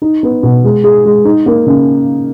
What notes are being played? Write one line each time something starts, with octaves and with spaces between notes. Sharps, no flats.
D#4
B3
B2
G#3
G#4
G#3
D#4
A#3
C#3